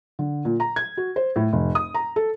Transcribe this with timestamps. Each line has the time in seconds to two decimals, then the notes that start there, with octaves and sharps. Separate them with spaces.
0.19 D3
0.45 A#2
0.60 A#5
0.76 G#6
0.97 F#4
1.16 C5
1.36 A2
1.53 F1
1.75 D#6
1.94 A#5
2.16 A4